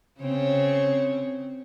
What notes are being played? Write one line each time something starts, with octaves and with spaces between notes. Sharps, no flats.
C#3 C4 C#5